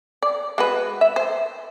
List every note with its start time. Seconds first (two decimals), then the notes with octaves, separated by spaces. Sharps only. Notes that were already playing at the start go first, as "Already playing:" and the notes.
0.22 D5
0.58 G#3 F#4 B4
1.01 E5
1.16 C5